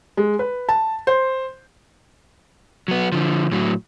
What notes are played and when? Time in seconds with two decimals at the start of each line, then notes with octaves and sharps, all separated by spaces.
0.17 G#3
0.39 B4
0.69 A5
1.07 C5
2.88 F#3 B3
3.12 D3 F3
3.52 A2 F#3